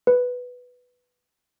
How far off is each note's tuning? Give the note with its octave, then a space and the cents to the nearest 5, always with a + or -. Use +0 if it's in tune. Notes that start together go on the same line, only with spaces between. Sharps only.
B4 +0